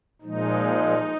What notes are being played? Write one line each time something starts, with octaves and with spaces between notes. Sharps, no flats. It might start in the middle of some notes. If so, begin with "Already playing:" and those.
A#2 F3 G#3 D#4